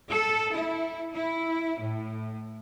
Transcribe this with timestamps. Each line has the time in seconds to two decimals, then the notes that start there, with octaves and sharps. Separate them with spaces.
0.11 A4
0.55 E4
1.12 E4
1.78 A2